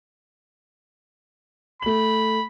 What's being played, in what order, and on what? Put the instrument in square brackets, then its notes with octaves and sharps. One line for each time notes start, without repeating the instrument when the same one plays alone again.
[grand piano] A3 F#7 [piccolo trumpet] B5